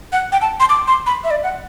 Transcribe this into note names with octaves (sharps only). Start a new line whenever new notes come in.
F#5
G5
A5
C6
D6
C6
B5
E5
D5
F#5